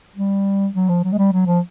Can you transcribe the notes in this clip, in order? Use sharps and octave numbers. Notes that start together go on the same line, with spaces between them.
G3
F#3
F3
F#3
G#3
G3
F#3
F3